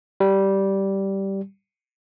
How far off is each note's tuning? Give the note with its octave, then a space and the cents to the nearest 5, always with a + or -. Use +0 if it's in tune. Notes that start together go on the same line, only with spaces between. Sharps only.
G3 -10